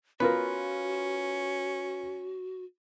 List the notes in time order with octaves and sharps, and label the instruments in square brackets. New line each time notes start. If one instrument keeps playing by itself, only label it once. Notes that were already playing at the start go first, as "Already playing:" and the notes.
[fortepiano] B3 F4 A#4 [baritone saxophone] C#4 [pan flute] F#4 [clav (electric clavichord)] B4